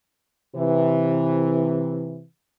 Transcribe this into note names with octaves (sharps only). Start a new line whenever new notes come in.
C3 E3